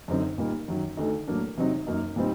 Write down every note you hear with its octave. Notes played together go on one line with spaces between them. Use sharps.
F#2 D3 F#3 C4 D#4
A#2 G3 A#3 D#4
F#2 D#3 F#3
D2 D3 A3 D#4
A2 F#3 A#3 D4
C3 F#3 C4 D#4
F#2 F#3 A#3 D#4
A#2 G3 C4 D#4